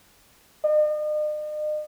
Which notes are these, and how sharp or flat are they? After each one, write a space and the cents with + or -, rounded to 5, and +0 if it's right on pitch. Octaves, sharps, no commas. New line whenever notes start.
D#5 -45